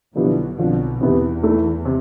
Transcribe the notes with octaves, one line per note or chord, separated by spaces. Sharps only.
B1 B2 D3 F3 B3 E4 G4
B1 B2 D3 F3 C4
E2 C3 E3 B3 E4 G4
E3 A3 E4
C3